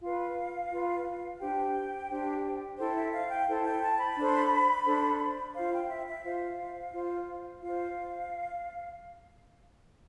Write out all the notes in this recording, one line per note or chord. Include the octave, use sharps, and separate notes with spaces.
F4 B4 F5
F4 B4
D4 G4 C5 G5
D4 G4 C5
E4 A4 C5 G5
E5
F5
G5
E4 A4 C5
G5
A5
B5
D4 A4 C5
D4 A4 C5
F4 C5 F5
G5
E5
E5
F4 C5 F5
F4 C5
F4 C5 F5